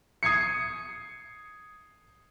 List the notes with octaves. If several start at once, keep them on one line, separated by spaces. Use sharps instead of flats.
D#6 G#6 C7 C#7